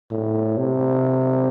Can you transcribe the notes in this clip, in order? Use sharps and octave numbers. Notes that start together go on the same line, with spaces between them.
A2
C3